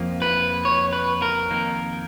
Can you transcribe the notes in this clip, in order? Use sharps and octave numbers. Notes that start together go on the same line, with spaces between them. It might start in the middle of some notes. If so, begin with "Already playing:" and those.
Already playing: F2 F3 A#3
B4
C#5
B4
A#4
F2 D#3 A#3